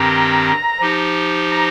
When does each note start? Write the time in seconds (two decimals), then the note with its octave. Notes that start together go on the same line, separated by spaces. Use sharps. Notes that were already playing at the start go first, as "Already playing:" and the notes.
Already playing: G2 D#3 C4 G4 A#5
0.80 F3 D#4 G4
1.52 A#5